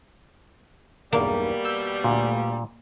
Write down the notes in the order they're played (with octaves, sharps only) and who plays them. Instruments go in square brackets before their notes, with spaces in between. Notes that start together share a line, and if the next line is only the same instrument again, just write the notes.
[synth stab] B1 E2 G2 [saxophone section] B2 G3 [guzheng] A#3
[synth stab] E6 G6
[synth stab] D2 [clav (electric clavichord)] A#2